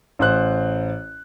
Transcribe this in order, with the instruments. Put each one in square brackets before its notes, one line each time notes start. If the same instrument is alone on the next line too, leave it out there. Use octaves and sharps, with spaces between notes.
[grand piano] A1 C5 F#6